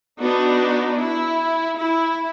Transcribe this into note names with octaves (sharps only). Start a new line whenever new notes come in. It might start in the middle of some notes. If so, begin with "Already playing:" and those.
B3 D4 D#4 F#4
E4
E4